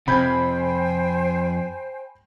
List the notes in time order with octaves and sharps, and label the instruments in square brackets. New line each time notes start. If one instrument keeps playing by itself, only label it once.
[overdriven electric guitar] F2 [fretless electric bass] C3 [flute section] C5 G5 G#5 [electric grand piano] B5 G6 G#6